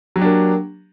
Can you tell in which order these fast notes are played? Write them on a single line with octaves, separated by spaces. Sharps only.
F#3 G4 D4 A#3